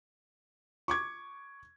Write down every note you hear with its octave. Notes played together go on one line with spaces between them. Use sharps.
C#6 D6 G#6